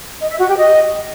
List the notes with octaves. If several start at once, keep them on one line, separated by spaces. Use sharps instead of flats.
D#5
E5
F#4
G4
D#5